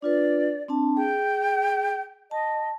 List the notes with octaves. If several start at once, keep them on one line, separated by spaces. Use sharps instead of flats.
D4 F4 B4 D5
C4 D4 A5
G#4 G5
D#5 A5